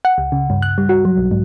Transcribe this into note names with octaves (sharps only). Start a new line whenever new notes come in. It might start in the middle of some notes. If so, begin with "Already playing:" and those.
F#5
C#2
C#3
G2
F#6
G3
F#4
F#3
B1
G#2